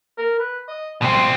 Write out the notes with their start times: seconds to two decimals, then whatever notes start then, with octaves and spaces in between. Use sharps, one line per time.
0.18 A#4
0.39 B4
0.69 D#5
1.02 B2 C4 F4